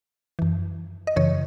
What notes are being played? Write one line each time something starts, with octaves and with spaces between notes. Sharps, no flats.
F#2 E3
D#5
F#2 C#3 E3 C#5